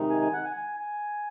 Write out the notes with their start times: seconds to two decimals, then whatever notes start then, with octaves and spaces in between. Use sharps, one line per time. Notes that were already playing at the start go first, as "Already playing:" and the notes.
Already playing: C3 D#3 G#3 D#4
0.10 G#5
0.21 G#5
0.33 F#5
0.45 G#5
0.56 G#5
0.80 G#5